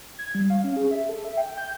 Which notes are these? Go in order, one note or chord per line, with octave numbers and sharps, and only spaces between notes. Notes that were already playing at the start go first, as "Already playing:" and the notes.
G#6
G3
F5
C#4
G#4
E5
A4
E5
G5
G6